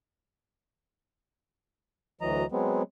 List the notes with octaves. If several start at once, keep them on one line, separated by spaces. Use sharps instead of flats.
D2 E3 F#3 D#5 A#5
F#3 G#3 B3 C4